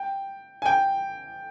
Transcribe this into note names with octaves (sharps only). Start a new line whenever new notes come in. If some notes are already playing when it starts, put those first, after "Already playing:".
Already playing: G5
G#5
G5